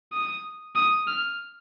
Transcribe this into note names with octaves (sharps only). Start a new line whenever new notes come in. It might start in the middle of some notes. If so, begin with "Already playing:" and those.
D#6
D#6
F6